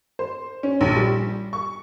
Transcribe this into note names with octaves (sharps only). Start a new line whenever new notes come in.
C5
C#4
A#1
G3
C#6